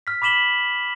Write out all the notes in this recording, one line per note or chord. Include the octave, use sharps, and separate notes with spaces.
F6 B6
B5 D6 B6 E7 F#7 G7